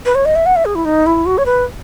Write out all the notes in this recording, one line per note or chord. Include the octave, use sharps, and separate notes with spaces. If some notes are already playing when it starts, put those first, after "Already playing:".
B4
C#5
D#5
E5
F#5
E5
G#4
E4
D#4
E4
F#4
C#5
B4